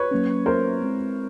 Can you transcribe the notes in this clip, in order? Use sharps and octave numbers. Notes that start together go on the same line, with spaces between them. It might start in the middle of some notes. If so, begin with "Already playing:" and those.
Already playing: B4 C#5
F#3 A#3 C#4
A#4 C5
G#3 C4 E4